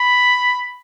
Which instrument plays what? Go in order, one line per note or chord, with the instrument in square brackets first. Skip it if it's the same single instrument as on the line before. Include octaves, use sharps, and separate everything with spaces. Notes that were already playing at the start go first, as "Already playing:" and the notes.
Already playing: [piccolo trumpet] B5